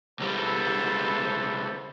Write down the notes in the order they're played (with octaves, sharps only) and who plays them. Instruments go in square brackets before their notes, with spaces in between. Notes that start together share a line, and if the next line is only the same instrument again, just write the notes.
[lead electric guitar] C#2 G3 [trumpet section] B3 A4 C5